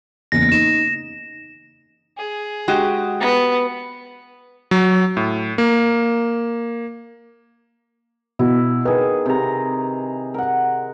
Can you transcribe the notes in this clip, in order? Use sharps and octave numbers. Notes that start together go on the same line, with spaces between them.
F#1 E2 A#6
D#4 E7
G#4
G#3 F#4 G4
B3
F#3
A2
A#3
B2 E4
D#3 G#4 B4
C3 A#5
A#4 F#5